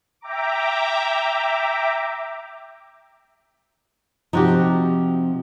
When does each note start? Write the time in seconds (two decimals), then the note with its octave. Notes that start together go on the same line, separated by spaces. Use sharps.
0.21 E5 G5 A#5 D6
4.33 C3 F3 D#4 F#4 G4